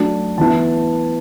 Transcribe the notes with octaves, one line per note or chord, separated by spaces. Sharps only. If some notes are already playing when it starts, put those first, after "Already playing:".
Already playing: F#3 A3 D4
E3 B3 E4 A5